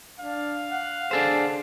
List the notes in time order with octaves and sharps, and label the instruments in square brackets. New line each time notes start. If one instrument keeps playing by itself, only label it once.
[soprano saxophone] D4 [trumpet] F5
[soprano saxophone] F#5
[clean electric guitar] D4 A4 C5 [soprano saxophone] G#4